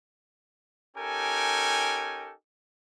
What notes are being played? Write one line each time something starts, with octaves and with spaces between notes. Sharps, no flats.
C#4 D#4 G4 A4 A#4 G#5